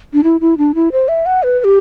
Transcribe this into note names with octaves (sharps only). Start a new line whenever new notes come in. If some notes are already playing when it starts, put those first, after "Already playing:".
D4
E4
E4
D4
E4
C5
E5
F#5
B4
B4
G4